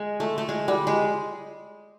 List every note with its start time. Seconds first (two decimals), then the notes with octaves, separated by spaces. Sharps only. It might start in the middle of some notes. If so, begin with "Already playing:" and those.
Already playing: G#3
0.20 A3
0.38 A3
0.49 G#3
0.68 G3
0.87 G#3